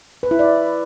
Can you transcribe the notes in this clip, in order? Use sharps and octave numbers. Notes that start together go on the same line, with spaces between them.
B4
E4
D5